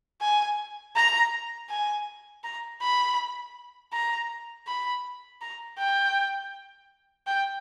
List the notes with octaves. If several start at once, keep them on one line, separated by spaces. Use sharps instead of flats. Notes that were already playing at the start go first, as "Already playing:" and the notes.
G#5
A#5
G#5
A#5
B5
A#5
B5
A#5
G5
G5